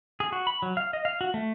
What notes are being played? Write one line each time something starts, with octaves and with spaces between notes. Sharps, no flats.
G#4
F#4
B5
F#3
F5
D#5
F5
F#4
A3